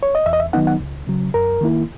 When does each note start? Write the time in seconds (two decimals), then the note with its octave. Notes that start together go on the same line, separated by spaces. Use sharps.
0.03 C#5
0.15 D#5
0.26 E2 E5
0.33 D#5
0.40 E5
0.53 D#3 F#3 B3 D#4 F#5
0.67 F#5
0.80 C#2
1.07 C#3 F#3
1.34 F#2 A#4
1.61 D#3 A#3 E4